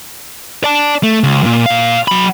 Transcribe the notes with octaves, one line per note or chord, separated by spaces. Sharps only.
D5 A5
A3
C#2
F#2 A#2
A#2 F5
F#3 B5